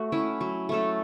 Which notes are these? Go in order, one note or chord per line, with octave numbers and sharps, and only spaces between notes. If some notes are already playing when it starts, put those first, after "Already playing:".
Already playing: A3 F#4
C#4 E4
F#3
A3 C#4 A4